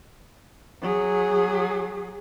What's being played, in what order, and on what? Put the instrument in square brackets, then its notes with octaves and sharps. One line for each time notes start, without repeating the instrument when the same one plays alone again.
[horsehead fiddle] F#3 G#4